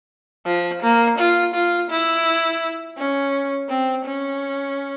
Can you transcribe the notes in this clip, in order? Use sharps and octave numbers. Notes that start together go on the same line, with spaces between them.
F3
A#3
F4
F4
E4
C#4
C4
C#4